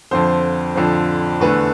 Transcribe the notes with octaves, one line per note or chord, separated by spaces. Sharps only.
F2 D3 F3 C5
F2 D3 F3
E2 D3 A3 B4